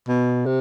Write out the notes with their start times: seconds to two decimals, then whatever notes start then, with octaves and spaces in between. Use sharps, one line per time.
0.08 B2
0.45 C3